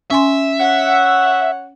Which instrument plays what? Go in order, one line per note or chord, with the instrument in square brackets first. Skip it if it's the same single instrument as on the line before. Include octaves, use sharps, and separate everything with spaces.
[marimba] C#4 G#5 C6 [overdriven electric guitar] E5
[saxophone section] C#5 F#5